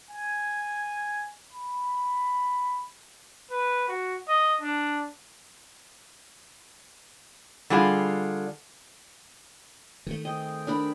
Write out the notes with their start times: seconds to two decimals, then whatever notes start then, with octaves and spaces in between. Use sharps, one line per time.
0.11 G#5
1.52 B5
3.51 B4
3.88 F#4
4.28 D#5
4.61 D4
7.70 D3 G3 F4 G#4 F5
10.07 D#3 A3
10.25 C4 G#4 D#5 G5
10.67 D4 A#4 B5